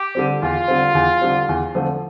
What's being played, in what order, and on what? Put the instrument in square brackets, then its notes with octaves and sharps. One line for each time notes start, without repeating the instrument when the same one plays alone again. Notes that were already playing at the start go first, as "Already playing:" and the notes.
Already playing: [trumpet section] G4
[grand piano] D3 G3 C4
[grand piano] E2 [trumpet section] F4
[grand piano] D3 G3 C4
E2
D3 G3 C4
E2
D3 F3 A3 C4